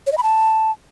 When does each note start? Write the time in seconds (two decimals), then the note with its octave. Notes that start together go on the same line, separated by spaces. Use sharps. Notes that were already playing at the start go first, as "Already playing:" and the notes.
0.07 C#5
0.12 D#5
0.18 B5
0.23 A5